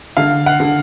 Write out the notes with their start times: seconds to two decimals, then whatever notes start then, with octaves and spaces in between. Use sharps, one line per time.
0.17 D3 F5
0.46 F#5
0.60 D3